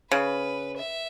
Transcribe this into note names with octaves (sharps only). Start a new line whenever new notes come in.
C#3 B4
E5